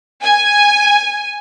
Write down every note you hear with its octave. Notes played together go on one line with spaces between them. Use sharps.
G#5